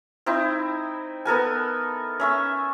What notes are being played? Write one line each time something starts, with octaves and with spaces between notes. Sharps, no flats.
C4 D#4 E4
B3 A4 A#4 G#5
C#4 E5 C#6